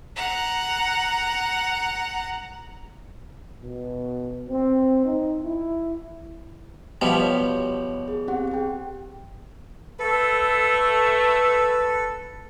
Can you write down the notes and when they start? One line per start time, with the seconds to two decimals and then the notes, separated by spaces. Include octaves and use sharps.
0.16 F#5 A#5
3.62 B2
4.49 C4
5.05 D#4
5.44 E4
7.01 B2 F3 G3 B3 D#5 B6
7.19 F#4 C#5
8.08 G#4
8.28 C4 G4 F#5
8.51 G#4 G5
10.00 A3 A4 B4